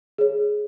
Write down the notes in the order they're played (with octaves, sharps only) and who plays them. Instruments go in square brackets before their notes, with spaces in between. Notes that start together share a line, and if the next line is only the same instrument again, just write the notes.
[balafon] G#4 C#5